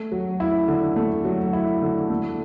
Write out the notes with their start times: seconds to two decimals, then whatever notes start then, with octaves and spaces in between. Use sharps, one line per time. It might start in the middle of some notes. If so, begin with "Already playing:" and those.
Already playing: A3
0.12 F#3
0.40 E4
0.68 D3
0.96 A3
1.25 F#3
1.53 E4
1.82 D3
2.10 A3